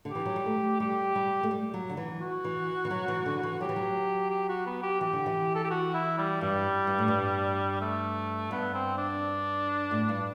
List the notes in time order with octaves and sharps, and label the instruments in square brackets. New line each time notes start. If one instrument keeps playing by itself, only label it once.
[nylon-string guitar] D3
[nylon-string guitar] E3 [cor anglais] G4
[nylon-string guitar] F#3
G3
A3
[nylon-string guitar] G3 [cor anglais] G4
[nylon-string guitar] G3
A3
G3
F#3
D3
E3
[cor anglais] F#4
[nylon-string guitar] E3
E3
F#3
E3
D3
E3
[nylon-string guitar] F#3 [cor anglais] G4
[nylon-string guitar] E3
F#3
[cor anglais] G4
F#4
B3
G4
[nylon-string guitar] E3 [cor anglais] G4
[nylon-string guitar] D3
E3
[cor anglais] A4
G4
F#4
E4
G3
[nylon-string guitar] G2 [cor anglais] G3
[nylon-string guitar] G2
A2
G2
[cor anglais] A3
[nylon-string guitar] G2 [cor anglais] B3
[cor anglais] C4
D4
[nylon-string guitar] A2
G2